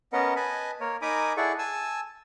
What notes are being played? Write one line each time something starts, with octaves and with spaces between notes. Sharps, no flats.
B3 C#4 A#4 B4 D#5 F#5
B4 D#5 G#5 A5 B5
A#3 A#4 C#5
D#4 A#4 G#5 B5 D6 D#6
E4 G#4 A4 D5 F#5 C#6
G#5 A5 E6